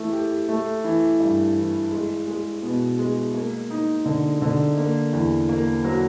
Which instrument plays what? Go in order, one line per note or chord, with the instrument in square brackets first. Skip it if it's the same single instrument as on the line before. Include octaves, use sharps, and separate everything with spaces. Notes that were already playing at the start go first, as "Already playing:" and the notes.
Already playing: [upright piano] E3 A3
G4
A3
E3
G2
E3
G#3
G#3
B2
G#3
A#3
D#4
D3
D3
A#3
E2
A#3
F#3